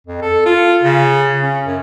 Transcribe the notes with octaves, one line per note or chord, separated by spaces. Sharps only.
F2
A4
F4
C#3
C#4
F#2